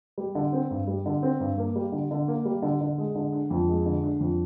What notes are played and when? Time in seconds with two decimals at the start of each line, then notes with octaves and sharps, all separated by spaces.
0.18 G3
0.35 D3
0.53 C4
0.71 G2
0.87 G3
1.06 D3
1.23 C4
1.40 G2
1.58 A#3
1.76 G3
1.92 D3
2.11 D3
2.28 A#3
2.45 G3
2.62 D3
2.81 D3
2.98 G#3
3.15 D3
3.33 D4
3.50 F2
3.69 G#3
3.86 D3
4.03 D4
4.20 F2